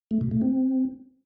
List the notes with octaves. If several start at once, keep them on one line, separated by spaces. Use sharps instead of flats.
A3
B2
A3
C4